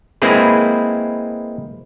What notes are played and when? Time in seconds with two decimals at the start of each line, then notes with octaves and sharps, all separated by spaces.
0.22 G#3 A#3 C4 E4 G#4 B4